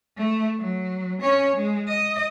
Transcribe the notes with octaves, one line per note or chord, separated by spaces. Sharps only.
A3
F#3
C#4 C#5
G#3
D#5